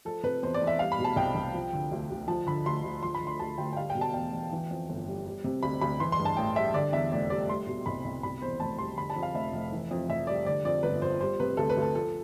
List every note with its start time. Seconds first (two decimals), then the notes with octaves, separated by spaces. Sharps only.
0.05 F3 A4
0.23 C3 B4
0.43 E2 C5
0.54 D5
0.61 E2
0.67 E5
0.79 G3 F5
0.92 B5
0.98 B2
1.04 A5
1.16 C2 G5
1.35 C2
1.54 F3
1.73 D3
1.92 D2
2.10 D2
2.28 F3 A5
2.46 D3 B5
2.66 D2 C6
2.84 D2
3.02 F3 C6
3.15 B5
3.21 D3
3.27 C6
3.39 D2 A5
3.58 D2 G5
3.73 G5
3.77 G3 F5
3.90 G5
3.95 B2
4.01 A5
4.14 E2 G5
4.33 E2
4.52 E3
4.71 F2
4.89 G1
5.07 G3
5.26 G3
5.44 C3
5.63 D2 B5
5.81 D2 B5
6.00 E3 C6
6.12 C6
6.19 G2
6.25 A5
6.37 A1 G5
6.56 G3 E5
6.74 D3 D5
6.93 E2 E5
7.12 F1 D5
7.30 G3 D5
7.48 G3 C6
7.67 B2
7.86 C2 B5
8.05 C2
8.23 B2 B5
8.42 E2 C5
8.60 F1 A5
8.78 G3 C6
8.97 D3 B5
9.10 A5
9.16 F2
9.23 F5
9.35 F1 E5
9.53 F1
9.72 E3
9.91 F2
10.09 F1 E5
10.27 G3 D5
10.46 D3 D5
10.65 F2 D5
10.83 G1 B4
11.02 F3 C5
11.20 G3 C5
11.40 C3 B4
11.57 D2 A4
11.69 B4
11.77 D2
11.82 A4
11.95 F3 A4